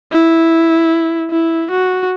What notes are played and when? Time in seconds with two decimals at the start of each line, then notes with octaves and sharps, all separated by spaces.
0.12 E4
1.31 E4
1.71 F#4